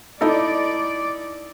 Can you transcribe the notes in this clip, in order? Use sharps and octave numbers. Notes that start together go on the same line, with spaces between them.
D#4 E4 A4 D5